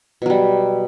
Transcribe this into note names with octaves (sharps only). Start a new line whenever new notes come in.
B2 F#3 G3